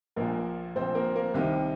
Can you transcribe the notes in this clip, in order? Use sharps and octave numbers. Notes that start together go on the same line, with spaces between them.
A#1 A#2 A#3 A#4
A#1 A#2 C4 C5
A#3 A#4
A#3 A#4
C2 C3 D#3 G4